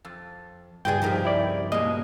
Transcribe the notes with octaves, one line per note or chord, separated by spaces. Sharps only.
F2 A6
C#2 G2 G#3 G4 G#4 B4 D5 G5
F3 C4 D#4 G4 A#4 D#6
E4 D5
B2 G#3 A#3 D#5